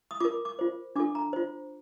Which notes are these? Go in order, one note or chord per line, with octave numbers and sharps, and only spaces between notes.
D#6
F4 A#4 D6
D6
F4 C5
D4 F4 A4 D6
A#5
F4 C5